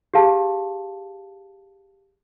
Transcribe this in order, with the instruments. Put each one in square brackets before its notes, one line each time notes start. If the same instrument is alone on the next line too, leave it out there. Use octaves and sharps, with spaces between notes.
[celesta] G4 G#4 F5 A5